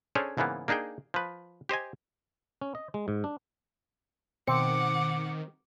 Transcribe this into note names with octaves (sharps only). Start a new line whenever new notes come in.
C#4 D4 G#4 A4 C5 C#5
G#2 C#3 E3 A#3 B3
A#3 D4 D#4 G#4 G5
F3 B4
G4 C5 D#5 G#5
C#4
D#5
G#3
G#2
D4
B2 D#3 C4 F#5 D6 C#7